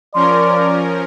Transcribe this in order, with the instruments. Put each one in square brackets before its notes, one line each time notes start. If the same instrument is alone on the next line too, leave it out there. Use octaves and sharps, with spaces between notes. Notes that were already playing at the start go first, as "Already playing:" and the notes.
[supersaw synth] F3 C#4 A#4 [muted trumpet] D5 [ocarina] C6